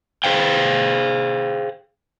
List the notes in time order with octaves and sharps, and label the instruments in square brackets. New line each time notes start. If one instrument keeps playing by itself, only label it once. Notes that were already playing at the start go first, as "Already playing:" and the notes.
[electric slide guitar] G#4 C5 F5 G5